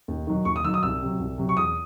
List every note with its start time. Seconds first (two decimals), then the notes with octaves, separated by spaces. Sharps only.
0.08 D#2
0.27 D#3 F#3
0.45 D#2 C#6
0.56 D#6
0.64 D#3 F#3 E6
0.74 D#6
0.83 C2 E6
1.02 C3 F#3
1.20 C2
1.38 C3 F#3
1.49 C#6
1.57 E2 D#6